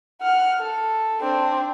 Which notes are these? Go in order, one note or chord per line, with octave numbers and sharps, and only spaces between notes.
F#5 F6
A4
C4 D4